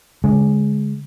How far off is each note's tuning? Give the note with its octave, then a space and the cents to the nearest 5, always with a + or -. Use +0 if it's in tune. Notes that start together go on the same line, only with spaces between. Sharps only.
D3 -35 G#3 +0